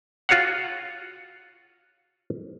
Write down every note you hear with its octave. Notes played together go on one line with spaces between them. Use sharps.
F4 F#4 C#5 F5 F#5